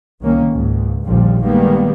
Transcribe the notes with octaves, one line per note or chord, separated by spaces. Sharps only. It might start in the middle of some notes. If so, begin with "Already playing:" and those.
C2 D#3 A#3 C#4
C#2 G#2
A#1 D#2 A#2 D3 F3 G3
D#3 G3 G#3 A#3 B3